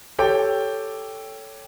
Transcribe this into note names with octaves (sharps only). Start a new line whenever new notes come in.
G4 A4 C#5 G5 G6